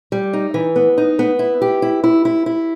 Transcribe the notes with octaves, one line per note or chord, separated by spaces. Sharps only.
G3
D#4
E3
B3
D#4
B3
E4
G4
E4
E4
E4
E4